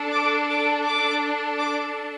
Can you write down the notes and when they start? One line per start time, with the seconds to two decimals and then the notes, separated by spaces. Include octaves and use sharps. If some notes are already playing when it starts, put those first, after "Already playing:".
Already playing: D4 A4
0.12 D6
0.49 D6
0.85 D6
1.59 D6